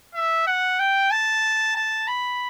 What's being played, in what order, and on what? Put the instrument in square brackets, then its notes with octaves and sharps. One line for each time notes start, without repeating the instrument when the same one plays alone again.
[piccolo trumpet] E5
F#5
G5
A5
A5
B5